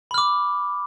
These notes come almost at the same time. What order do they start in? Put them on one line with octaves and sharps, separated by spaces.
B5 F6 D6